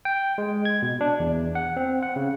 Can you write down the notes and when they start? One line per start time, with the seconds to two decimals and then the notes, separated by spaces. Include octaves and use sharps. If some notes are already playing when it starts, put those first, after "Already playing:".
0.05 G5
0.38 G#3
0.65 G#6
0.82 B2
1.01 D4
1.20 E2
1.55 F#5
1.76 C4
2.03 F#5
2.16 C#3